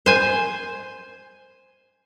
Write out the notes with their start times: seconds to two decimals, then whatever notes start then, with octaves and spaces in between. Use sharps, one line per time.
0.06 C5 G#5